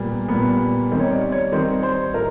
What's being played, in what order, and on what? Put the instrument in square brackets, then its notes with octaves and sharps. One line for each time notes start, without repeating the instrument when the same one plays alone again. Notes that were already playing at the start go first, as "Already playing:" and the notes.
Already playing: [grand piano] A#2 G3 B3
A#2 G3 B3
D#3 G3 C4
C#5
D5
C#5
D#3 G3 C4 C5
C5
A2 A#4